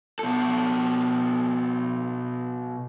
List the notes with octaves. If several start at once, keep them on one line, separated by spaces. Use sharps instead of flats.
B2 A4